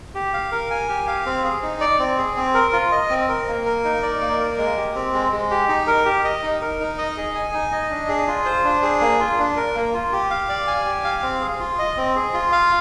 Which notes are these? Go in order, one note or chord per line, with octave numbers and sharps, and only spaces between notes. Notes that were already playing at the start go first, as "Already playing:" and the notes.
G4
F5
A#4
G#5
G4
F5
C4
G#4
D#4
D5
C4
G#4
C4
A#4
F4
D#5
C4
A#4
A#3
A#4
D#4
D5
A#3
A#4
G#3
G4
C4
G#3
G#3
G4
D#4
A#4
G4
D#5
D#4
A#4
D#4
D#5
G#4
G#5
D#4
D#5
D4
G#4
F4
C5
D4
G#4
A#3
F4
D4
A#4
A#3
F4
G4
F5
D5
G#5
G4
F5
C4
G#4
F4
D#5
C4
G#4
F4
F5